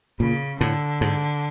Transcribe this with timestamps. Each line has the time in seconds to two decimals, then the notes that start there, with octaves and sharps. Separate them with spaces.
0.20 A#2 C#3
0.60 A2 D3
1.01 G#2